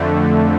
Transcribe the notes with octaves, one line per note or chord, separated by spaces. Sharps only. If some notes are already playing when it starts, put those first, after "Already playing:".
Already playing: F2 D3 A3